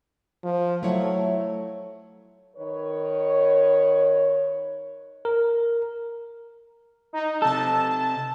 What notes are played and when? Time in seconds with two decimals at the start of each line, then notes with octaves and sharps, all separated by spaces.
0.44 F3
0.83 F#3 A3 E4 C#5
2.57 D#3 B4 C#5
5.25 A#4
7.13 D#4
7.42 C3 A4 A5